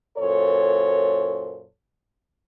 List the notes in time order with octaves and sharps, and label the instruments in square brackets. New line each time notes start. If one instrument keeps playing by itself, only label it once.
[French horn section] F#2 A#2 A4 C5 C#5